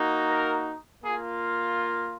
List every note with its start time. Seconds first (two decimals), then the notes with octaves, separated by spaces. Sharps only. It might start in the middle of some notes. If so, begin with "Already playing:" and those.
Already playing: A#3 D#4 F#4
0.30 A#4
1.04 A#3 F4 G#4